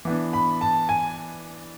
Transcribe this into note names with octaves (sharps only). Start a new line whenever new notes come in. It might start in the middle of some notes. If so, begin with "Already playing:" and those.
E3 B3 D4
B5
A5
G#5